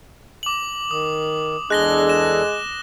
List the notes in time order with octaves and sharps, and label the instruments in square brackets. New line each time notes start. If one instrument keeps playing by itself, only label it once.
[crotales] D6 F#7
[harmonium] D#3 [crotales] D#6
[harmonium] E2 D4 A4 [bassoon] G#3 [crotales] F#6 A#6 G7
[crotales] E7